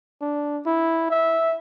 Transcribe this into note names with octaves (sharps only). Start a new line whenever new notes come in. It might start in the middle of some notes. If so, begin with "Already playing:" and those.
D4
E4
E5